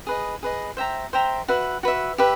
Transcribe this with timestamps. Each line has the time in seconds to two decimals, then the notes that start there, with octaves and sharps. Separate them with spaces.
0.07 G#4 B4 D#5
0.43 G#4 B4 D#5
0.77 C5 E5 G5 A#5
1.13 C5 E5 G5 A#5
1.48 F#4 B4 E5
1.83 F#4 B4 E5
2.18 G4 B4 E5